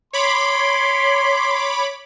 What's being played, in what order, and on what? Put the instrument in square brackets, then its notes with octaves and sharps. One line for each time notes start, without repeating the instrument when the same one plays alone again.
[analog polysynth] C#5 B5 D6 [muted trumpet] C6